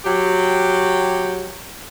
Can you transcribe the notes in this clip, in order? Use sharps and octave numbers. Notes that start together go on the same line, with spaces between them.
F#3 G4